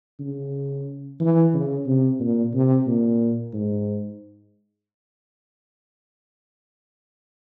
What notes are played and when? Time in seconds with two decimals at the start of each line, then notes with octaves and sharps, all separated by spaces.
0.20 C#3
1.20 E3
1.54 C#3
1.86 C3
2.20 A#2
2.54 C3
2.86 A#2
3.54 G#2